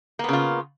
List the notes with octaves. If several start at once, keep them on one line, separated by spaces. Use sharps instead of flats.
C#3 A#3 B3 F4